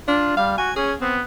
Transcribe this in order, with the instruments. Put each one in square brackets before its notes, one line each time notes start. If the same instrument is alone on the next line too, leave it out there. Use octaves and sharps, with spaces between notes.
[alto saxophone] D4 [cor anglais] F4
[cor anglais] G3 [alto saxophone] F5
[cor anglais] F#4 [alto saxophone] G#5
[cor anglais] C#4 [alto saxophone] G#4
[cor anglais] B3 [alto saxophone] C4